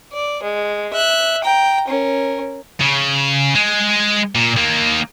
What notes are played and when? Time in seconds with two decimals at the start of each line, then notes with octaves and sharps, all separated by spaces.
0.13 D5
0.43 G#3
0.93 E5 F#6
1.44 G5 A#5
1.87 C#4 A#4
2.81 C#3
3.55 G#3
4.35 A#2
4.57 D#3 A#3